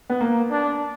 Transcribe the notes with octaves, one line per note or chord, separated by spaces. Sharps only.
B3
A#3
D4